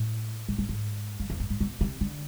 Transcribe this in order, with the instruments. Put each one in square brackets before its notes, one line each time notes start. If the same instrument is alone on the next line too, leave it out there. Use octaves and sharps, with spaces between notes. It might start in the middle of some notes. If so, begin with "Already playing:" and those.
Already playing: [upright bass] A2
G#2
A2
G#2
F2
E2
G#2
G#2
B2
C3
D3